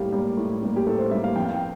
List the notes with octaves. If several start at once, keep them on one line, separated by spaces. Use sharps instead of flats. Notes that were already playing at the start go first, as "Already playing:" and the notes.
Already playing: A2 G3 A#3 G4 F5
G3 A#3
A2
G3 A#3
G4
A2 A4
C5
G3 A#3 E5
F5
F2 G5
F5
G5